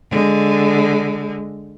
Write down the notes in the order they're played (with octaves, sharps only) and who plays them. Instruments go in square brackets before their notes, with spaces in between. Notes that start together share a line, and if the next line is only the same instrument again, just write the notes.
[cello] D3 G#3